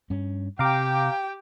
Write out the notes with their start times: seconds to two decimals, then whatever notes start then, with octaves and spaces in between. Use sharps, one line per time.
0.10 G2 C#4
0.59 C3 G4 F5 G5 A#5 D6